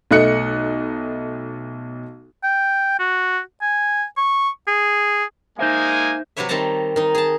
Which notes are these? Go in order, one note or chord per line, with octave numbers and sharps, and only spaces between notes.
B1 A3 D#5 F#6 C#7
G5
F#4
G#5
C#6
G#4
G#3 A#3 D#4 C5 E5 G#5
C3 F#3 G4 B4 C#5 E5
D#3 G3 C4 C#5 A5 A#5
D#3 D#4
G#4 A5